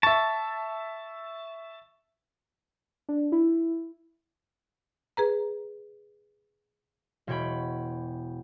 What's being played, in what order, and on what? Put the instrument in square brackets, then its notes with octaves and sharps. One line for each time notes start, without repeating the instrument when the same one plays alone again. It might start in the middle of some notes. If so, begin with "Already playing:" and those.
[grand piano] E5 C#6 [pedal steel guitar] A5
[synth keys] D4
E4
[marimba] G#4 B4 A#5
[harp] E1 B2 C#5 G5 B5